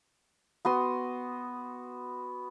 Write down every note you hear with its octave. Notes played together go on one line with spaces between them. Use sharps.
B3 F#4 C6 D#6